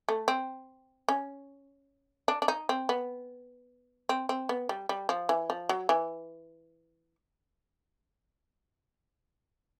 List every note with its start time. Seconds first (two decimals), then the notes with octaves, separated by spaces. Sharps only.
0.09 A3
0.28 C4
1.09 C#4
2.28 D4
2.42 D4
2.48 D#4
2.69 C4
2.89 B3
4.09 C4
4.29 C4
4.49 B3
4.69 G3
4.89 G3
5.09 F3
5.29 E3
5.50 F3
5.69 F#3
5.89 E3